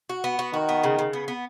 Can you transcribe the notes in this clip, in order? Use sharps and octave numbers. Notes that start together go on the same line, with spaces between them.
F#4
B3
F#4
D#3 F#4
B3
C#3
C#3
B3
B3